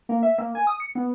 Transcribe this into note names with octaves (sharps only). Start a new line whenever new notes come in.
A#3
E5
A#3
G#5
D#6
C#7
B3